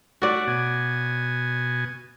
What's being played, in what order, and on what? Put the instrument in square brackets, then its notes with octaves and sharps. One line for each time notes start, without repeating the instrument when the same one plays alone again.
[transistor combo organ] A3 [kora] F#4 D5
[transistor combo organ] B2 G#5